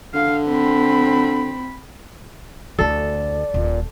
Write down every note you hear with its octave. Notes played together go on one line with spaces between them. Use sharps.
D3 F5
C4 B5
D2 D3 E4 A4 D5
D#1 A#2